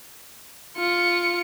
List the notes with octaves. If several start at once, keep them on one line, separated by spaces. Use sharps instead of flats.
F4 C#7